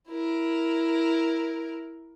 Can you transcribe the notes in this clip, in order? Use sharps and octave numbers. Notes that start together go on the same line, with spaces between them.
E4 A#4